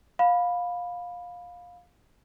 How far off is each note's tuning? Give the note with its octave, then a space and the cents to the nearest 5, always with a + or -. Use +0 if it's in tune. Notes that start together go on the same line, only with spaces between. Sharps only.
F5 +20 B5 +0